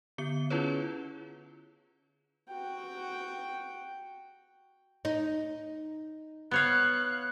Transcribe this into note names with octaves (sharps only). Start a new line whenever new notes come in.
D3 B3 C#7 G7
C#4 E4 F4 G#4 B4 C#5
F#4 G5
D#4
B3 C#5 F5 F#6